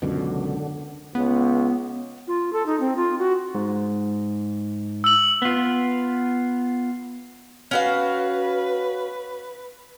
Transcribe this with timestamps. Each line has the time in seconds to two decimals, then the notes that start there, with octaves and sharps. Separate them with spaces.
0.02 C#2 F#2 B2 D3
1.15 C#2 B3
2.28 F4
2.53 A4
2.66 D#4
2.80 C4
2.97 F4
3.19 F#4
3.55 G#2
5.04 E6 F#7
5.42 B3 F4
7.71 C#4 F#4 B4 F5